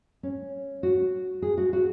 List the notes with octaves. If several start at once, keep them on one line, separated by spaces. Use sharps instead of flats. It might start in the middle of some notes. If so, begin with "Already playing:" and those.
C#4
F#4
G#4
F#4
F#4